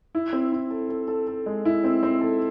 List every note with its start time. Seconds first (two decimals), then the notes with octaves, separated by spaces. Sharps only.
0.15 E4
0.33 C4
0.52 E4
0.71 A4
0.89 A4
1.08 A4
1.27 A4
1.46 G#3
1.65 E4
1.84 C4
2.03 C4
2.21 A4